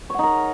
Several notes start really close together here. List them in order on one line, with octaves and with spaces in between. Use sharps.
C#5 F#5 D#4 A#4